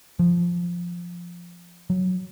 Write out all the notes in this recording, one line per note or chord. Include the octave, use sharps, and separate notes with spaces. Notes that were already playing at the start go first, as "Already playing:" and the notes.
F3
F#3